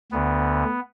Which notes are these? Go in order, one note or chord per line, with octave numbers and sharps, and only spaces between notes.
D2 D3 B3